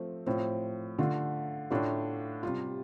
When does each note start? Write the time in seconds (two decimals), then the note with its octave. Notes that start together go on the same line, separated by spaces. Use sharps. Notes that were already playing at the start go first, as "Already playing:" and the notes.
Already playing: F3 A3 C4
0.26 A2 F3 C4
0.98 D3 A3 F4
1.71 A2 A3 D4 F4
2.43 C3 G3 F4